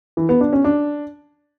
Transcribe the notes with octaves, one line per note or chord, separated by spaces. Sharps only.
E3
B3
D4
C#4
D4